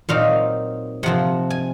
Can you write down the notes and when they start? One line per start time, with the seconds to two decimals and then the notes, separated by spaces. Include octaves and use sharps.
0.09 A#2 F#3 C4 D#4 F5
1.03 C3 F3 C4 F#5
1.50 G#5